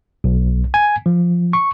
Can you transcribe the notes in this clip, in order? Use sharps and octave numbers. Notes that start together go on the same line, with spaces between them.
B1
G#5
F3
C#6